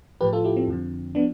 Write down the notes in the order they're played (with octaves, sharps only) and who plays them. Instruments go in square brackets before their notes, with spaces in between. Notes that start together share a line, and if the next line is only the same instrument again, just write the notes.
[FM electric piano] A2 F3 G4 B4
F4 A4
E4 G4
C4
F2 D3 F3
F3 B3 D4